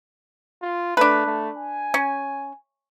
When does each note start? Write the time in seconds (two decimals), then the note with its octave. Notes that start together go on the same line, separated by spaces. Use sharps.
0.62 F4
0.97 A3 D4 B4
1.26 A3
1.57 G#5
1.94 C#4